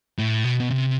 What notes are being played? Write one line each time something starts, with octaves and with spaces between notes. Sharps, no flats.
A2
B2
B2
C3